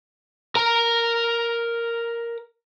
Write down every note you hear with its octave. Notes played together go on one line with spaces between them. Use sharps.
A#4 A#5